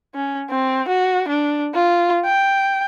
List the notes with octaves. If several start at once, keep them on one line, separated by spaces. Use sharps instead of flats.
C#4
C4
F#4
D4
F4
G5